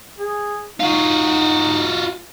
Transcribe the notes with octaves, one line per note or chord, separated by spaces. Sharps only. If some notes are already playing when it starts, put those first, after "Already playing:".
G#4
D#4 F4 F#4